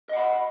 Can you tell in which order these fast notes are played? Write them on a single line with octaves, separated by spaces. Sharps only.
D#5 F#5 B5